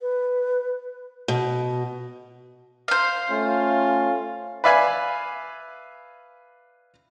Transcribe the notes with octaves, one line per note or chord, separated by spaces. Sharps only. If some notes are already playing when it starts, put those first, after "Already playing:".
B4
B2
C5 F5
A3 C#4 F4
B4 D5 E5 F5 G#5 B5